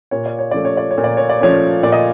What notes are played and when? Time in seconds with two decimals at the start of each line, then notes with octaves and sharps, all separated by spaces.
0.11 A#2 C#5
0.26 D5
0.39 C#5
0.51 F3 A3 C#4 D5
0.65 C#5
0.77 D5
0.91 C#5
0.98 A#2
1.04 D5
1.17 C#5
1.29 D5
1.41 F3 A3 C#4 C#5
1.83 A#2 D5
1.92 D#5